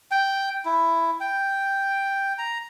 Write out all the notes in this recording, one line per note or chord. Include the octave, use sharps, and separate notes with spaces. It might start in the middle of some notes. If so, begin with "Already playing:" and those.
G5
E4
G5
A#5